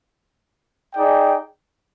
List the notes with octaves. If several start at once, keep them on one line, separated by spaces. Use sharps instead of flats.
D#4 G#4 D5 G5